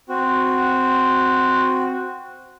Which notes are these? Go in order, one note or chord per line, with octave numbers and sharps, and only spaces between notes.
C4 F#4